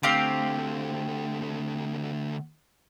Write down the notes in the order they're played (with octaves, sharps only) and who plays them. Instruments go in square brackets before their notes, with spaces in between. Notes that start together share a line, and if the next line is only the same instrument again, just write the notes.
[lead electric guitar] D3 A3 [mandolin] C4 G4 F5